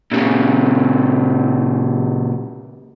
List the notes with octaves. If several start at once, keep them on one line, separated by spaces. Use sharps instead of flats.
A#2 C#3